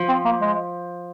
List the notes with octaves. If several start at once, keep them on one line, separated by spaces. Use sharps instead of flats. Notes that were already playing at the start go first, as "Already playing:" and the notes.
Already playing: F3
C4
A#3
G#3